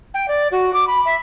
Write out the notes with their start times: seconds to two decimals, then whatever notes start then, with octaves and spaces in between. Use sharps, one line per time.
0.14 G5
0.28 D5
0.51 F#4
0.73 D6
0.87 B5
1.05 E5